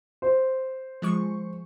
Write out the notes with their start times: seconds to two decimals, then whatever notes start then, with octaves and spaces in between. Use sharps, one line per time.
0.22 C5
1.02 F3 G#3 C#6